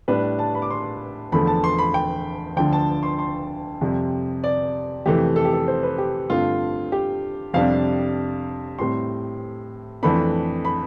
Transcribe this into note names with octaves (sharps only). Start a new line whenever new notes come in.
A2 G3 D4 B4
A5
B5
D6
C6
E2 D3 F3 A3 B5
A5
C6
B5
G5
D2 D3 F3 G5
A5
C6
C6
F2 C3 G3
D5
F2 C3 E3 A3 G4
A4
G4
A4
C5
B4
G4
G2 D3 A3 C4 F4
G4
F2 C3 G3 D4 F5
A2 G3 C4 C6
F2 E3 A3 D4 B5
B5